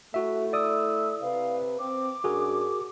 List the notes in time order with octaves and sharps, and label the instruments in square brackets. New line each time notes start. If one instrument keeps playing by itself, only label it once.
[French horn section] A3 E4 [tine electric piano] F#4 E5
[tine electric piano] D5 D#6 [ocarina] E6
[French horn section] C3 B4 [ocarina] F5
[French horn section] C4 [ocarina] D6
[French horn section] F#2 D4 [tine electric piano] F#4 G#4 A#4